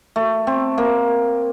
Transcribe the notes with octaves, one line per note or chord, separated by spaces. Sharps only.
A3
C4
A#3